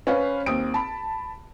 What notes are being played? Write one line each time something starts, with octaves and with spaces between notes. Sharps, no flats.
C#4 B4 C5 F5
D#2 C4 D#6 D7
A5 B5